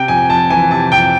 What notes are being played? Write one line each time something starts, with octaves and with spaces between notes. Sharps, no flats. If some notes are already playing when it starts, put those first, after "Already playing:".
Already playing: C3 G5
F2 G#5
F2 A5
E3 G#5
C3 A5
F2 G5